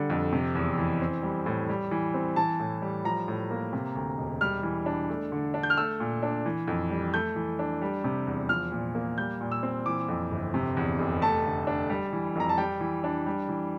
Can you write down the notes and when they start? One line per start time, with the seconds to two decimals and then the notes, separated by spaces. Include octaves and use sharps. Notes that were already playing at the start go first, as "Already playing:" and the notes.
Already playing: D3 G3 D4
0.10 F2
0.33 C3
0.55 E2
0.78 E3
1.01 C4
1.23 G3
1.46 A2
1.69 G3
1.91 E3
2.14 C4
2.36 E3 A5
2.60 A2
2.82 G3
3.05 F3 A#5
3.28 A2
3.51 A#3
3.73 C3
3.95 D2
4.18 E1
4.41 G3 F6
4.63 E3
4.86 D4
5.09 A3
5.32 D3
5.54 D4
5.63 G6
5.70 F6
5.77 A3 E6
6.00 A#2
6.23 D4
6.46 E3
6.68 F2
6.90 G3
7.14 A3 G6
7.36 E3
7.59 D4
7.82 G3
8.04 C3
8.27 E2
8.49 F3 F6
8.72 A#2
8.95 A#3
9.18 G3 G6
9.41 A#2
9.52 E6
9.63 C4
9.86 E3 D6
10.08 F2
10.31 G1
10.54 C3
10.77 E2
10.99 F1
11.22 A3 A5
11.45 D3
11.67 D4
11.90 G3
12.13 E3
12.36 F2 A#5
12.49 A5
12.58 G3 G5
12.80 E3
13.04 D4
13.26 G3
13.49 E3